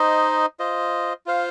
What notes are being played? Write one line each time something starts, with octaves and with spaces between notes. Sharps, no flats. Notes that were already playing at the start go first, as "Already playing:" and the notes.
Already playing: D#4 C5 D#5
F4 C5 D#5
F4 C5 F5